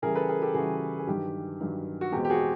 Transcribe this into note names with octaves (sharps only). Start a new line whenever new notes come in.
C#3 E3 G3 G#4 A#4
A4 B4
G#4 A#4
G4 A4
C#3 E3 G3 F#4 G#4
G#4
G2 D#3 F#3 G4
G2 D#3 F#3
F#4
E2 B2 G#3 C4 G4
G4
F#4 G#4